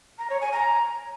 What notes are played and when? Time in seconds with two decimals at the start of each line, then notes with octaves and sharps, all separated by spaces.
0.19 A#5
0.30 C#5
0.41 G#5
0.52 A#5